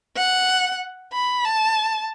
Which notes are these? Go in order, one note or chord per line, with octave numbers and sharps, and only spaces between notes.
F#5
B5
A5